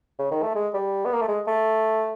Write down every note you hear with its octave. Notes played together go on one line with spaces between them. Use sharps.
C#3
D#3
A3
G#3
G3
B3
A#3
A3
G#3
A3